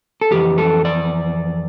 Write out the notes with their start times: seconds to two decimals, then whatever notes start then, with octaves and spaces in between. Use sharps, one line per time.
0.21 A4
0.31 F2 E3 G4
0.58 A4
0.85 D5